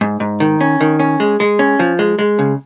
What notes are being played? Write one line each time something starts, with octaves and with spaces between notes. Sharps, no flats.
G#2
G#2
D#3
C#4
D#3
C#4
G#3
G#3
C#4
F3
G#3
G#3
C#3